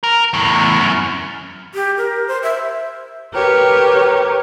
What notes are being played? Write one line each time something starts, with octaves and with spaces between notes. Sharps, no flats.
A#4
E2 A2
F#2
G4
A#4
C5
E5
G4 A#4 B4 C#5